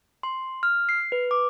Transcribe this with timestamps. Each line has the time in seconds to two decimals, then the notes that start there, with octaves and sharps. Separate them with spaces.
0.23 C6
0.63 F6
0.89 C7
1.12 B4
1.31 D6